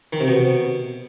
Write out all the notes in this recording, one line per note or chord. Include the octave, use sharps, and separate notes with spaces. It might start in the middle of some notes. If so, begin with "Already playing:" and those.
D#3
C3
B2